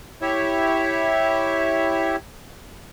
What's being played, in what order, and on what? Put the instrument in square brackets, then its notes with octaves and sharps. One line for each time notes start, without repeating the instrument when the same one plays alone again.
[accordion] E4 G4 C#5 E5